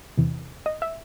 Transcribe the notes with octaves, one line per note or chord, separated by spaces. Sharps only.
E2 C3 E3
D#5
E5